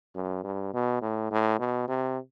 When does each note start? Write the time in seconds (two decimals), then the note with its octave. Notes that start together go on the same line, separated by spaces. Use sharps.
0.15 F#2
0.44 G2
0.74 B2
1.02 A2
1.31 A2
1.59 B2
1.88 C3